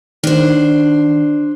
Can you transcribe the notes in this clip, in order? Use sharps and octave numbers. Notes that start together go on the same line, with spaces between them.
D#3 D4 C5